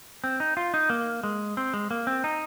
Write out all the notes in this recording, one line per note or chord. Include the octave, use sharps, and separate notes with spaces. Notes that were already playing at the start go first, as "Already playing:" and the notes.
C4
D#4
F4
D#4
A#3
G#3
C4
G#3
A#3
C4
D#4